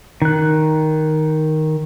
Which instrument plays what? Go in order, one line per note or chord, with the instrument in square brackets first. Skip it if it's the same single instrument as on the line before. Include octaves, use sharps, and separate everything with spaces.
[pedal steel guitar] D#3 F#6